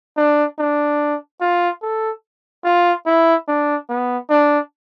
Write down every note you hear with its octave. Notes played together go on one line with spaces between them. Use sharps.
D4
D4
F4
A4
F4
E4
D4
B3
D4